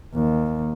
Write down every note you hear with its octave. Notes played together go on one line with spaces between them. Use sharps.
D#2